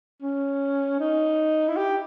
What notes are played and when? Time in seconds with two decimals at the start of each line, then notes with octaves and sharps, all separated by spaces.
0.22 C#4
1.00 D#4
1.68 E4
1.76 G4